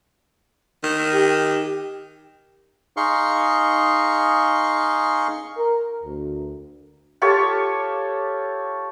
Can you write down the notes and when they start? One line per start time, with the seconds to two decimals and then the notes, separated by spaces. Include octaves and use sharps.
0.84 D#3
1.12 G4
2.97 D#4 G#4 F5 C6 C#6
5.57 A#4
6.04 D2
7.22 F4 G4 A4 C#5